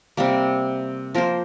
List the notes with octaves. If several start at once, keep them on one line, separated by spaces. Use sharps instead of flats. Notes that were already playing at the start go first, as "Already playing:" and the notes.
C3 G3 A#3
F3 A#3 F4 C5